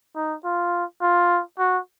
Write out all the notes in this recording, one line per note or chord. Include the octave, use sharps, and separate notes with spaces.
D#4
F4
F4
F#4